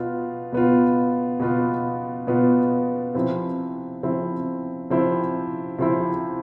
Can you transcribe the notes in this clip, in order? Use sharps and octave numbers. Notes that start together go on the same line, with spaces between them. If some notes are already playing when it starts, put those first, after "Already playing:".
Already playing: B2 B3 F4
B2 B3 F4
B2 B3 F4
B2 B3 F4
C3 F3 C4 E4
C3 F3 C4 E4
C3 F3 C4 E4
C3 F3 C4 E4